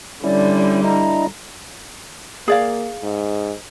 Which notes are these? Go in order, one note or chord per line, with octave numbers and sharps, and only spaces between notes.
D3 G3 C#4 E4 D5
D4 E4 D#5 A#5
A#3 G#4 D5 F5
G#2